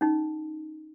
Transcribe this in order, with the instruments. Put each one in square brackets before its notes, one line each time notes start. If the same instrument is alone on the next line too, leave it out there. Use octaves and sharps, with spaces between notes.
[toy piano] C#4 D#4